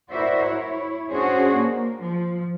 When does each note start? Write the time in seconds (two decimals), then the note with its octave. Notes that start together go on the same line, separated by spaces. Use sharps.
0.10 E4 F#4 A#4 C5 D5 E5
0.46 E4 C#5
1.11 C#4 D4 F#4 G#4 C5 C#5
1.58 A#3
2.04 F3